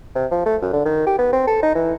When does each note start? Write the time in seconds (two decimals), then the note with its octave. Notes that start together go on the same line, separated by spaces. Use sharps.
0.15 C3
0.31 F3
0.46 A3
0.62 F#2
0.73 D3
0.86 D#3
1.07 G4
1.19 B3
1.33 C4
1.48 A4
1.63 D#4
1.75 E3